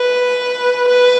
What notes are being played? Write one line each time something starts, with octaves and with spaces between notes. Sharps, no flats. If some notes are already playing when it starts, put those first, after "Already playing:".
Already playing: B4
B4